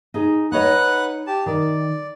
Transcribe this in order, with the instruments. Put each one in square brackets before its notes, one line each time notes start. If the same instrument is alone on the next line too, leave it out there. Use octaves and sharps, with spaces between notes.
[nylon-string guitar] D#4 G#4
[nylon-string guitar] D#4 C#5 D#5 [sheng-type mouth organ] B4 F#5 F#6
[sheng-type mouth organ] G4 A5
[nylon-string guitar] D#3 [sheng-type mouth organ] D5